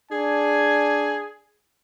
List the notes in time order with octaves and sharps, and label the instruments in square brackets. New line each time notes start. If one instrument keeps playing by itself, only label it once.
[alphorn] D4 [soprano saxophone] G#4 [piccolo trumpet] G#5